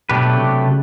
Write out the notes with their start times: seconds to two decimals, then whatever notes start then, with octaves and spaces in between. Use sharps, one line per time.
0.09 B2 F#3 A3 D4 G4 B4
0.37 C3
0.66 C#3